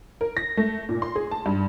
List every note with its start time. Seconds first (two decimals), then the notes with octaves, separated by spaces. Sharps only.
0.21 A#4
0.37 A#6
0.57 A3
0.89 A#2
1.02 C6
1.16 G#4
1.31 A5
1.46 G2